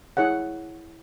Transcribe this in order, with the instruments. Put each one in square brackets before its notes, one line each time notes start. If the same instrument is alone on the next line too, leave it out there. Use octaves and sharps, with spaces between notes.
[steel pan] E4 G#4 C#5 F#5